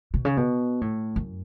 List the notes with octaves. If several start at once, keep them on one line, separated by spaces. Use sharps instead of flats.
B2
C#3
B2
A2
F#2